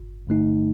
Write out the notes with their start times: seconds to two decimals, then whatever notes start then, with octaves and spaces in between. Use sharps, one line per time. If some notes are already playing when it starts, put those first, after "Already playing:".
Already playing: G1
0.27 G2 D3 A3 D#4